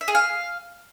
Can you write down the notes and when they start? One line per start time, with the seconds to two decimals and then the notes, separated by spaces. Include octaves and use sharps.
0.01 E5
0.08 G#4
0.15 F5